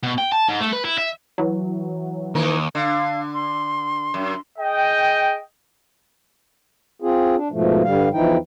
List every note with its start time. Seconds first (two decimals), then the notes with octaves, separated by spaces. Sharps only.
0.03 B2
0.18 G5
0.32 A5
0.49 G#2
0.60 A3
0.73 B4
0.85 E4
0.98 E5
1.38 E3 F#3
2.35 D#2 E3 D#4 A#4
2.75 D3 F5
3.33 C6
4.14 F#2
4.58 G#4 D#5 G5
7.02 C4 F4 G#4
7.36 D4
7.52 G#2 B2 F3 A3
7.84 G2 D3 G3 F5
8.13 E2 E3 F3 D#4 E4 G5